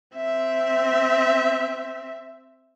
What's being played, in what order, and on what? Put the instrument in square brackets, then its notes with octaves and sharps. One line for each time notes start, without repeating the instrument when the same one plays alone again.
[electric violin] C4 E5